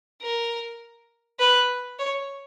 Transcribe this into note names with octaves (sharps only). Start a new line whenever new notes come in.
A#4
B4
C#5